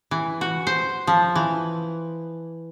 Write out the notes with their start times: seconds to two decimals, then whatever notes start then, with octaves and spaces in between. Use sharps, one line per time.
0.11 E3
0.41 F#4
0.67 C5
1.07 F3
1.35 E3